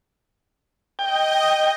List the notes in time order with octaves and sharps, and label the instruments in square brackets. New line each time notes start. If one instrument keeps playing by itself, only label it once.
[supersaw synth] D#5 [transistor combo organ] G5